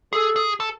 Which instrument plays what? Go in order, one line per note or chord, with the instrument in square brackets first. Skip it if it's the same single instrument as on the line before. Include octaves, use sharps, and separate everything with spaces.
[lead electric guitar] G#4 [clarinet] A4
[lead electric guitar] G#4
A4